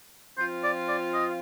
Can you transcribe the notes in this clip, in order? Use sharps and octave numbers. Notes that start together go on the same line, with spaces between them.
F3 C4 F4 C5
D5
D5
D#5